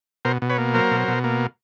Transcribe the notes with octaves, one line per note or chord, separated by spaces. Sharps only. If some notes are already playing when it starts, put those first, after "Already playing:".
B2 A#4 C5
B2
B4 C#5
A#3
F#3 A#4 C5
B2
B2
A#3